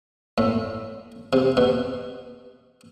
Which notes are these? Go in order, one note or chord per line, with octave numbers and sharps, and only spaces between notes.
A2
C3
B2